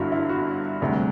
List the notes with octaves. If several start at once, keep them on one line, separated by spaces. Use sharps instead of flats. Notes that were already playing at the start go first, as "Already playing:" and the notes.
Already playing: G1 G2 D3 E4 F#4
E4
F#4
E1 D2 C3 G3